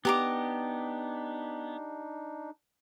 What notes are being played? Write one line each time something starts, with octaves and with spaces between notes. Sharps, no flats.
B3 D4 D#4 G4 A#5 D6